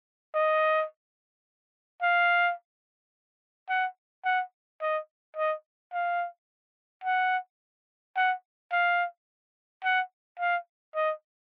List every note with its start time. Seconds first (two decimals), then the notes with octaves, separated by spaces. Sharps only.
0.34 D#5
2.02 F5
3.69 F#5
4.25 F#5
4.82 D#5
5.37 D#5
5.93 F5
7.04 F#5
8.16 F#5
8.72 F5
9.84 F#5
10.40 F5
10.95 D#5